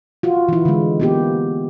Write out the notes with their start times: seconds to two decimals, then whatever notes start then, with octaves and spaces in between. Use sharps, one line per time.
0.23 F4 F#4
0.49 E3 E4
0.65 D3 G#3
1.00 A#3 B3 G4